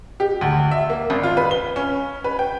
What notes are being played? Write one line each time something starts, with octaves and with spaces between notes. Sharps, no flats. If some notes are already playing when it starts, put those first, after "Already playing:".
G4
D2
E5
A#3
G#1
F4
B4
G7
C#4
B4
G5